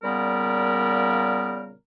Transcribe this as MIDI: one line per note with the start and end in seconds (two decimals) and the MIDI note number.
0.03 1.74 46
0.03 1.74 49
0.03 1.74 55
0.03 1.74 59
0.03 1.74 70